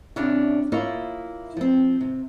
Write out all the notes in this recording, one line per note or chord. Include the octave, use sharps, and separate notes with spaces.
C3 C#4 D4 E4 D5 A5
A#3 E4 F4 C#5 D#5
F3 C4
C3